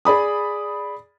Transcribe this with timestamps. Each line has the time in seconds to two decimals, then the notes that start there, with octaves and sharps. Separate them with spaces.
0.05 G#4 D5 B5 D#6